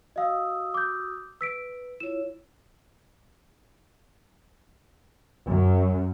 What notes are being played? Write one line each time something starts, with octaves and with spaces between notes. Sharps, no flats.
F#4 D#5 F5 D#6 E6
D6 G6
B4 E6 B6 D7
E4 F4 C#5 E7
F#2